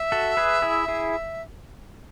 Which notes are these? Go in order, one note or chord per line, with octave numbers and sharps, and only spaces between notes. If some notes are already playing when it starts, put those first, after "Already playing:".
Already playing: E5
F#4 A4
G#4 B4
E4 G#4
E4 G#4